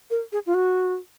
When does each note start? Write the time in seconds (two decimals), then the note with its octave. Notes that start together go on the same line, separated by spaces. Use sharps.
0.10 A#4
0.32 G#4
0.46 F4
0.54 F#4